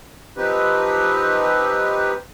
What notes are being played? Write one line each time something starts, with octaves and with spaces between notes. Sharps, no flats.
F3 C4 D#4 G4 B4